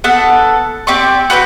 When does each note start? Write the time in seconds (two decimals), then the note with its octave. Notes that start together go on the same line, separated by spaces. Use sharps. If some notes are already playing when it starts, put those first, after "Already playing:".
0.04 B3 A4 F#5
0.87 C4 G4 D5 C#6
1.30 F#4 B4 D#5 G5